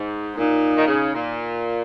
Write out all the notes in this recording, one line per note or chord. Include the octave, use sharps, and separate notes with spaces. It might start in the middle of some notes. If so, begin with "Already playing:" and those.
Already playing: G#2
A#2 D#4
D#3
C#3
A#2